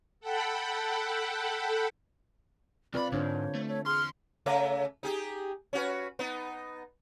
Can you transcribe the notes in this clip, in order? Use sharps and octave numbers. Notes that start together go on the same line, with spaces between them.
A4 F#5 G5 A5 B5
C2 C4 F4 B4 D5 B5
G#2 D3 D4 C5 C#5
A3
C#5
E2 G#4 C6 F6
C#3 A3 E5
D#4 G4 G#4
C#4 F#4 B4
B3 D#4